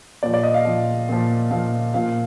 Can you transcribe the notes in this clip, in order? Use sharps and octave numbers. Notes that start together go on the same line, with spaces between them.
A#2 F3 D5
D5
D#5
F5
A#2 F3
A#2 F3
A#2 F3 F5
A#2 F3 F5